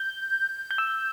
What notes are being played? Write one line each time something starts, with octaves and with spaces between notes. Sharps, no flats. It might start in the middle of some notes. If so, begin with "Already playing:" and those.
Already playing: G6
G6
E6